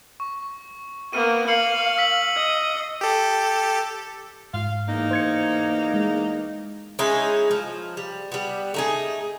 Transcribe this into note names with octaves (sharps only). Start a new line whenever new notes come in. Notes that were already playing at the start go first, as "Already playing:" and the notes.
C#6
A#3 B3 F6 D#7
F5 C7 C#7 F#7
E6 B6 F#7
D#5
G4 A4
G#2 F5
E2 A#3 D#4
C5 G#6 C#7
G#3
G#3 C#4 D#4 E4
F3
G3
G3 B3
A3 D#4 G#4